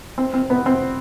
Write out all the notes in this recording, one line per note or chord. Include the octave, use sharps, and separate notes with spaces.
C4
C4
B3
C4